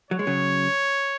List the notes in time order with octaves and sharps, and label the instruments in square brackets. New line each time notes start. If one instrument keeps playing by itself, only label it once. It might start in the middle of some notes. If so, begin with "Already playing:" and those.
[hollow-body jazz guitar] F#3 [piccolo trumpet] C#5
[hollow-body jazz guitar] G#3
C#3 F#3